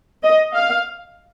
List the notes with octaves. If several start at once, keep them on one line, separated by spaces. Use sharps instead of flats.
D#5
F5